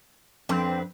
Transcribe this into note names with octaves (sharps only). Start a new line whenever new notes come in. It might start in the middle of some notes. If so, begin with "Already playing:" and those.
F2 C4 D4 B4